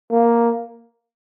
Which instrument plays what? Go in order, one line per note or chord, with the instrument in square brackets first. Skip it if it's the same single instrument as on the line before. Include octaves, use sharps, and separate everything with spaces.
[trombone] A#3